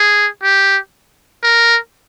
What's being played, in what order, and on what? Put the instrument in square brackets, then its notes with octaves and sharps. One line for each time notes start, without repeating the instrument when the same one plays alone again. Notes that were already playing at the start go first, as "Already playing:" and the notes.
Already playing: [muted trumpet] G#4
G4
A#4